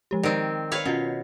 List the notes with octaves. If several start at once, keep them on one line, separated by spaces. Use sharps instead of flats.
F3 G#3 G4
D#3 C4 C5 D5
B4 C#5 F5
B2 C#4 F4